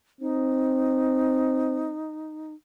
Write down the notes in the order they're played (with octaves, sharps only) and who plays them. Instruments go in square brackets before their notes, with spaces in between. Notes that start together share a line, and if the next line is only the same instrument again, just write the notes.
[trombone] C4 [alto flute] D#4